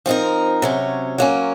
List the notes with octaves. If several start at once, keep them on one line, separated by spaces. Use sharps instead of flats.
F3 C4 D#4 A#4
C3 F#3 C#4
F#3 A#3 C#4